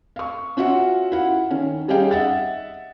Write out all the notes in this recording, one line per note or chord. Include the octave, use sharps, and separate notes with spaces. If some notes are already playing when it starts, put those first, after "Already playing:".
F5 C#6
C#4 F4 F#4 E5 F#5
E4 F5 F#5
D#3 C#4
G3 C#4 D#4 G#4 F5 G5
D#5 E5 F#5 A6